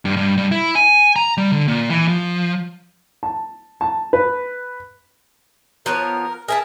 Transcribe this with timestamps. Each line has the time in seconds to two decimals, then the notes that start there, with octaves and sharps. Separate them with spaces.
0.05 G2
0.17 G2
0.37 G2
0.52 E4
0.75 G#5
1.16 A#5
1.37 G3
1.53 D3
1.68 A#2
1.90 E3
2.08 F3
3.23 A5
3.81 A5
4.13 B4
5.86 F3 B3 A#4 C#5
6.48 G#4 A#4 E5 A5